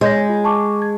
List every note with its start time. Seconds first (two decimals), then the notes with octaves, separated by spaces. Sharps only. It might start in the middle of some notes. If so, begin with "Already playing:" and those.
0.01 G#3 C#5 G6 A#6
0.29 F4
0.44 A5 C#6 D6
0.82 G#6